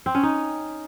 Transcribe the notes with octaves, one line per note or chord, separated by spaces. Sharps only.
C4
C#4
D#4